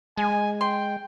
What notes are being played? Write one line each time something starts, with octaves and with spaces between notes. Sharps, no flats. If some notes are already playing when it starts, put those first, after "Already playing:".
G#3 G#5
G5 C6